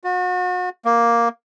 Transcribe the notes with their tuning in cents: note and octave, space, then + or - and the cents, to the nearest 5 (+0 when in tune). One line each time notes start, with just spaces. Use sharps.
F#4 -35
A#3 +5